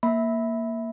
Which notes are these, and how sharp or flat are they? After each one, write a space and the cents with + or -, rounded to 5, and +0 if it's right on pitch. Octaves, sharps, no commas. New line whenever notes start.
A#3 +0 E5 -15 B5 +0